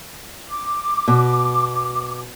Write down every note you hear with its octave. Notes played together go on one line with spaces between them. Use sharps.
D6
B2